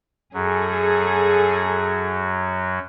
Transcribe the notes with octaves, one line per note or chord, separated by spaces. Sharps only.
F#2 F#3 G#4 A4